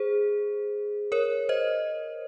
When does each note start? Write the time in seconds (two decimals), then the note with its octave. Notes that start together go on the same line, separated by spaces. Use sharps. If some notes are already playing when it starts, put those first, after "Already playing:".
Already playing: G#4 C5
1.12 A#4 C#5
1.49 C5 D#5